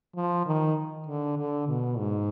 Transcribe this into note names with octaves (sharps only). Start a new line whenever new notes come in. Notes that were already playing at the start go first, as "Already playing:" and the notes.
F3
D#3
D3
D3
B2
G#2